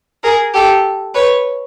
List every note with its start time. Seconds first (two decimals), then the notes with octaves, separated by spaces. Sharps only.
0.23 G#4 A#4
0.54 G4 A4
1.14 B4 C#5